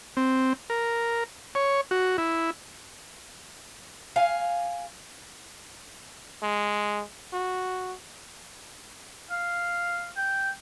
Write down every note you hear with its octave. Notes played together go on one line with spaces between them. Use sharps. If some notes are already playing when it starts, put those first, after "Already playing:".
C4
A#4
C#5
F#4
E4
F5 G#5
G#3
F#4
F5
G5